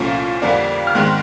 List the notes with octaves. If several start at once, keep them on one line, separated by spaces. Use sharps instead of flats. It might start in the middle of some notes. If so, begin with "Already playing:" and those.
Already playing: C2 A#2 F3 A3 C#4
F2 D3 G3 A#3 D4
F6
G#2 D#3 G#3 C4 F#6